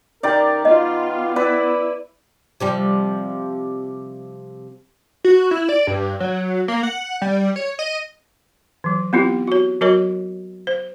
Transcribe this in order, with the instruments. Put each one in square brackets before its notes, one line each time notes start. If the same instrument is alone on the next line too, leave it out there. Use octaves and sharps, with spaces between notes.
[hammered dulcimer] D#3 G4 D5 [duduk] A#4
[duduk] B3 [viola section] F4 [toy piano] D#5
[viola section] E4 [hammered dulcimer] B4 D5
[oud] C3 F3 G3
[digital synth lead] F#4
E4
D5
G2
F#3
A#3
F#5
G3
C#5
D#5
[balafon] E3 F#3
B3 C4 E4 F4 G4
F#4 C#5
F#3 F#4 A#4 C#5 D#5
C5